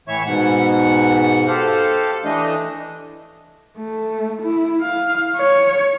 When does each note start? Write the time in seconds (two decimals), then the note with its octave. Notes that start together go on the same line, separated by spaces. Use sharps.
0.08 A2 E3 C#5 E5 C#6
0.26 G#2 B2 F#5
1.48 G4 A4 C5 F5
2.24 E3 A3 D4 D#5
3.78 A3
4.42 E4
4.81 F5
5.37 C#5